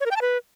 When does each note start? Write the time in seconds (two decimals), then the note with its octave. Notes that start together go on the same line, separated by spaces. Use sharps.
0.01 C#5
0.06 A#4
0.11 G5
0.16 A5
0.21 B4